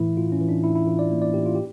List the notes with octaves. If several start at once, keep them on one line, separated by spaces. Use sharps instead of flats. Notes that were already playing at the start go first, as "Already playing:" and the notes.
Already playing: A2 E3 E4
A2 F4
C#4
E3
D4
A2 E4
E4
E3 F4
D5
A#3
D5
A2 G4
F4
G4